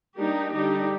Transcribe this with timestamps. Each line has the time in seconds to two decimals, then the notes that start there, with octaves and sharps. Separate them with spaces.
0.18 G3 A#3 D4 D#4 G4
0.54 D3 G3 D4 D#4 G4